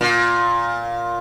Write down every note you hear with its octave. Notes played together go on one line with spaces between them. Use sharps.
A#2